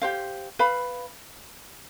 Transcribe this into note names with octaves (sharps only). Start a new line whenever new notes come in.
G4 C5 F5
B4 F5 B5